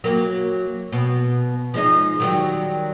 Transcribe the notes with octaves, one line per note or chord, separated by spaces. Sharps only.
F#3 A#3
B2
F3 G#3 D#4
D#3 F#3 G3